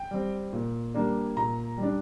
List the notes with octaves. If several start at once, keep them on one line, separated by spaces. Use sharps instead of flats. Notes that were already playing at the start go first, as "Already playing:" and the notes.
Already playing: G5
G3 C4
A#2
G3 A#3 D4
A#2 A#5
G3
D4